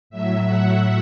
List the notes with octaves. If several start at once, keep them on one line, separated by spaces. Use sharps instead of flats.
A2 F#3 E5
F#5